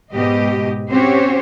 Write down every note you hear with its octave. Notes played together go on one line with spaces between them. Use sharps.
G#2 B2 G4 D#5
C4 C#4 F#4 G4 C5 C#5